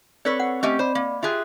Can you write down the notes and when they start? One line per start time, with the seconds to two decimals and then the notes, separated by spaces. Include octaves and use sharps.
0.25 C4 A4 B4 C#5 D5
0.40 F#5
0.63 A3 C4 C#4 G4 D#5
0.79 C5 D5 B5
0.95 A#3
1.23 F4 G4 G#4 E5 F#6